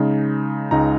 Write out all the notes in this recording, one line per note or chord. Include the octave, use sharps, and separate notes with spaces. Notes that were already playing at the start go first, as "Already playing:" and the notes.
Already playing: C#3 G#3 D#4
C#2 C#3 G#3 D#4 A#5